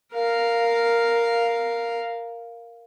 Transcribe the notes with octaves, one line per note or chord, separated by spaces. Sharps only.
A#4 F5